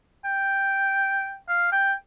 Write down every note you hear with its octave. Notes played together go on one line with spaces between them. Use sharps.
G5
F5
G5